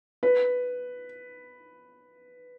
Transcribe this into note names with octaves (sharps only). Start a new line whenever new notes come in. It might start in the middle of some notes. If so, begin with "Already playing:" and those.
B4